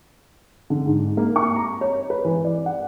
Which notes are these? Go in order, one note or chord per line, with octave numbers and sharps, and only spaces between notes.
D3
G#2
A#3
C#6
A#5
C#5
B4
E3
D5
F#5